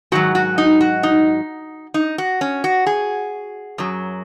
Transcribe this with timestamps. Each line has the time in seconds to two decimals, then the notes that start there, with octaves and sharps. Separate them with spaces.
0.12 G#2 D#3 F#3 F#4
0.35 F#4
0.58 D#4
0.81 F#4
1.03 D#4
1.94 D#4
2.18 F#4
2.41 C#4
2.64 F#4
2.86 G#4
3.78 F#2 F#3